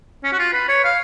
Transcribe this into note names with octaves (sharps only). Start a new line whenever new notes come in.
C#4
F#4
F4
B4
C#5
F5